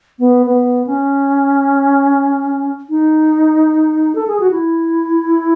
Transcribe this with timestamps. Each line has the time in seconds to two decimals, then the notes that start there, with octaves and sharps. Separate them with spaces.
0.19 B3
0.46 B3
0.87 C#4
2.90 D#4
4.15 A4
4.28 G#4
4.40 F#4
4.51 E4